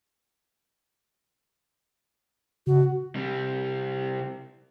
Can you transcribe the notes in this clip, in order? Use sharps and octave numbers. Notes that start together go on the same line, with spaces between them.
C#3 F#4
C3 G3